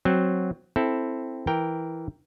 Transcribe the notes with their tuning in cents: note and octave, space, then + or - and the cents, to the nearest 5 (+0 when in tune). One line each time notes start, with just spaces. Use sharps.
F#3 +0 C4 +0
C4 +0 E4 +0 A4 +0
E3 +0 A#4 +0 G5 +5